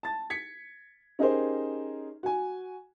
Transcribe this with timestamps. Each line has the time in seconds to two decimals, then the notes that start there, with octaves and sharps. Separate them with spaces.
0.03 A5 A6
0.30 G#6 B6 C#7
1.19 C#4 D#4 G4 G#4 A#4 C5
2.23 F#4 G#5